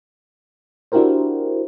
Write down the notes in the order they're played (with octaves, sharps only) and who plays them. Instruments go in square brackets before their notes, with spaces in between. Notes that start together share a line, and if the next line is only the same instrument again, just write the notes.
[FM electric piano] D4 E4 F#4 G4 A#4 C5